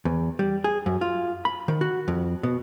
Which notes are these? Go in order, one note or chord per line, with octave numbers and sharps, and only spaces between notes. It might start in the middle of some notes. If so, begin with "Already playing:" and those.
E2
G3
G#4
F#2
F4
B5
D#3
F#4
F2
B2